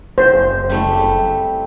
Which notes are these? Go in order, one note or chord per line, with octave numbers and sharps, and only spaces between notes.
F#1 C5
G3 A3 C4